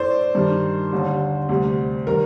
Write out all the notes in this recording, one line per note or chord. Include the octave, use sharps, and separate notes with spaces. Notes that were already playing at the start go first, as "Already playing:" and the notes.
Already playing: A2 A3 C5 D5
G2 D#3 G3
D#2 D3 G3
D2 C3 G3
D#3 G3 A#4